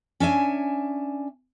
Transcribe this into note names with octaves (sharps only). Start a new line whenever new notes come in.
C#4 D4 E5 G#5